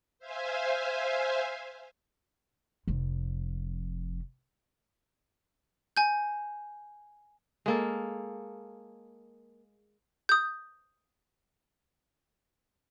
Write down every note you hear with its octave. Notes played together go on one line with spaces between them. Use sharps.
C5 E5 F5 G#5
F1 F2
G#5 G6
G#3 A#3 A4
D#6 G6